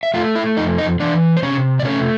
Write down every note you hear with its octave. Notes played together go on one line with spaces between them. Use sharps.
E5
A3 F4 F5
E4 E5
F2 D#4 D#5
D#4 D#5
E3 D4 D5
C5
C3 C#4 C#5
D5
A3 C#4 C#5